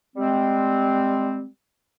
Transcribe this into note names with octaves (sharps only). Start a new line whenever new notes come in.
G3 G#3 C4